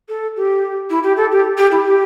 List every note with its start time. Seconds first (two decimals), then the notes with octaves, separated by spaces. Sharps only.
0.09 A4
0.36 G4
0.90 E4
1.03 G4
1.17 A4
1.32 G4
1.58 G4
1.72 E4
1.85 G4